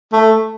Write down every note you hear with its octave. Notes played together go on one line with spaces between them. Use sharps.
A3